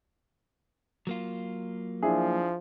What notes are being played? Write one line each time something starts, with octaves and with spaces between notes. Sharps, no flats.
F#3 A#3 F4
F3 D4 E4 G#4